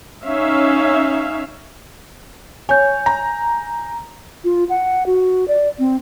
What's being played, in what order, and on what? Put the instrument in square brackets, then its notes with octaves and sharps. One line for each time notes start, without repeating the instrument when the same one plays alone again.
[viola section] C#4 D#4 E5 F5
[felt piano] C#5 [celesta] G#5 G6
[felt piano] A#5
[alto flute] F4
F#5
F#4
D5
C4